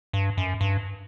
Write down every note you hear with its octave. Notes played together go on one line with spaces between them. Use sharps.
G2
F#2
G2